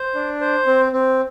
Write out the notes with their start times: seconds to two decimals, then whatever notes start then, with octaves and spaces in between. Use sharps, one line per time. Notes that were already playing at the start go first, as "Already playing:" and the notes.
Already playing: C5
0.15 D4
0.41 C5
0.66 C4
0.92 C4